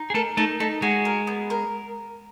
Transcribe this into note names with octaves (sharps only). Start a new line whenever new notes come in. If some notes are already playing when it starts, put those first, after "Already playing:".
Already playing: D#4
G#4
A3 A4 A#4
A3 D#4 A4
A3 D#4 A4
G#3 F#4 G#4
A#4
B3
A#4